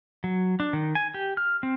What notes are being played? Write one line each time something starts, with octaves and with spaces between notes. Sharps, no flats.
F#3
D4
D#3
G#5
G4
F6
C4